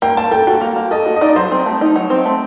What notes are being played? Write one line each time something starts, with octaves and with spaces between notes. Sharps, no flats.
A#3 G5
A#3 A5
A4 G5
F#4 G5
A#3
A#3
A4 D#5
F#4
D#5
D#4 D5
F#3 C5
C4
A3
D#4
F#3
C4
A3